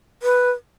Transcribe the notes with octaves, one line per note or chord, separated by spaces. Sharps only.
B4